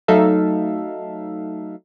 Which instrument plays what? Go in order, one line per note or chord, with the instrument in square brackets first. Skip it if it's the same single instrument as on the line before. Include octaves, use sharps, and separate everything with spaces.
[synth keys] F#3 A3 D#4 A4 E5 F5